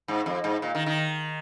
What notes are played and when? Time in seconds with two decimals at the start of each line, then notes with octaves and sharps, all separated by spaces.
0.08 G#2
0.26 F2
0.44 G#2
0.62 A#2
0.75 D#3
0.86 D#3